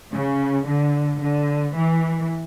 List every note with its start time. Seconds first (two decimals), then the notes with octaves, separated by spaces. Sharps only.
0.13 C#3
0.67 D3
1.21 D3
1.75 E3